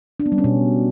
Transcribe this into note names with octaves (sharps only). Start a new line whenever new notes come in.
D4
B3
G3
C#4
B2